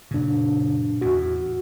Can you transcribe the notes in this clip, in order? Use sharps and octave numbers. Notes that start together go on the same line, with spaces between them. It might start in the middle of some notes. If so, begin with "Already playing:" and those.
F#2 A#2 C#3 D4
E2 A2 F#4